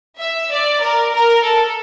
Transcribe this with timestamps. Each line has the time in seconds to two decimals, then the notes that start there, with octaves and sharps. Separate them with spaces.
0.20 E5
0.51 D5
0.81 A#4
1.13 A#4
1.44 A4